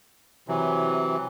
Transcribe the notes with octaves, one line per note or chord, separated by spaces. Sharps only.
C3 E3 F#3